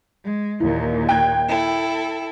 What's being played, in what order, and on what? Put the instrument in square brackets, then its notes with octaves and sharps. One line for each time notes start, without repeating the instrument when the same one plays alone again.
[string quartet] G#3
[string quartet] D#2 A#2 [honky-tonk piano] E3
[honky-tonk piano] G5 F#6 G#6
[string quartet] E4 A4